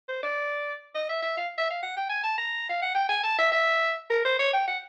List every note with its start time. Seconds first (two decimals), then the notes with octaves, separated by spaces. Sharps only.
0.08 C5
0.23 D5
0.95 D#5
1.09 E5
1.22 E5
1.37 F5
1.58 E5
1.70 F5
1.83 F#5
1.97 G5
2.09 G#5
2.23 A5
2.38 A#5
2.69 F5
2.82 F#5
2.95 G5
3.09 G#5
3.23 A5
3.38 E5
3.52 E5
4.10 A#4
4.25 C5
4.39 C#5
4.53 G5
4.68 F#5